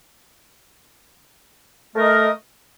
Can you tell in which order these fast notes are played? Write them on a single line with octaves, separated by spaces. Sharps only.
A3 A#4 D#5